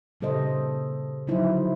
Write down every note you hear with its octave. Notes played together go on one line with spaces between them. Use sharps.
A#2 C#3 G3 A4 C5 D#5
D3 F3 F#3 D#4 E4 C5